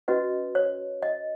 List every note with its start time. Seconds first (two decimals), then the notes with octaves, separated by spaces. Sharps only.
0.08 C#4 F#4 B4 D#5
0.55 C#5
1.03 D#5